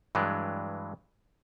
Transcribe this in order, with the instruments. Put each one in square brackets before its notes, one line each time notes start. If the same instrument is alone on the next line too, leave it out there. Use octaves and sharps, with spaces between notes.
[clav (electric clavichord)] G2 E3 F#3 G#3 D4